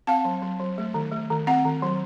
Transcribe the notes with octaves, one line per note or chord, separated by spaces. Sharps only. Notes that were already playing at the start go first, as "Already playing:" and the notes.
C4 F5 A5
F#3
F#3
F#3
A3
D#3
A3
D#3
C4 F#5 A#5
D#3
F#3